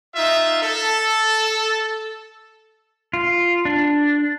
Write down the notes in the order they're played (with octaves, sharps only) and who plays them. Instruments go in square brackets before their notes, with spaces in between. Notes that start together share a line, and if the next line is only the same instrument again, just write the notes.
[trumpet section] D#4 F4 E5
A4
[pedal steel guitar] F4
D4